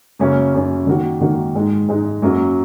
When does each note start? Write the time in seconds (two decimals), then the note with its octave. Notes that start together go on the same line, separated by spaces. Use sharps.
0.19 F#2 C#3 A#3 C#4
0.54 F#2 C#3 A#3 C#4
0.87 D#3 A#3 F#4
1.20 D#3 A#3 F#4
1.55 G#2 G#3 D#4
1.88 G#2 G#3 D#4
2.22 F#2 F#3 A#3